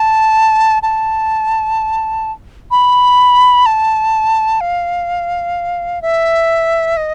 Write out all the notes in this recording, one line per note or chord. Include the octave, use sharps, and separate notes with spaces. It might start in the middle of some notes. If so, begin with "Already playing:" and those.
Already playing: A5
A5
B5
A5
F5
E5
D#5